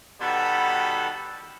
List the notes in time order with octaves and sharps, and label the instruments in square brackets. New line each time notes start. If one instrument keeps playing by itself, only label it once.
[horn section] B2 D#3 G3 F#4 A4 B5